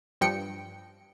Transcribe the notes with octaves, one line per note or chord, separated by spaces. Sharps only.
G2 F3 G5 C#7